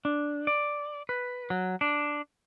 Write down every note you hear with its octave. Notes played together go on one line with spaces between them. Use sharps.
D4
D5
B4
F#3
D4